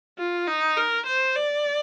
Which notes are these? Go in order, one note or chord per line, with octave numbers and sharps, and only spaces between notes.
F4
D#4
A#4
C5
D5